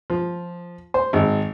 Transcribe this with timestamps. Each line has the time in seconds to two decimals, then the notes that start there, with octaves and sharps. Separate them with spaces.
0.10 F3
0.94 C5
1.13 G#1